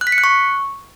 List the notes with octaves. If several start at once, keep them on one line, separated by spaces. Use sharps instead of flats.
F#6
B6
C#7
F#6
C#6